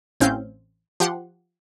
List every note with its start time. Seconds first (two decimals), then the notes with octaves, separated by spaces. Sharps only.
0.20 A1 C4 C#4 F5 G6
1.00 F3 G4 F#5 C6